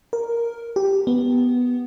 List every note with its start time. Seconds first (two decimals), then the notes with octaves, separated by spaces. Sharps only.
0.13 A#4
0.76 G4
1.07 B3